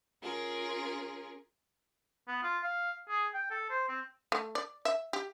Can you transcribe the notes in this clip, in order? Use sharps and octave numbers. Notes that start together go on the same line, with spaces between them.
C#4 F4 G#4 A#4
B3
F4
F5
G#4
G5
A4
C5
C4
A3
D5
E5
G4